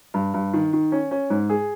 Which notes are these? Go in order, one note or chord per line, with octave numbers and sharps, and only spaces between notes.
G2
G2
D#3
D#3
C#4
C#4
G#2
G#4